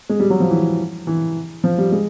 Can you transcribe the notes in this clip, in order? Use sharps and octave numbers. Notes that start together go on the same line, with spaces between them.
G#3
G3
F#3
F3
E3
E3
F3
G3
G#3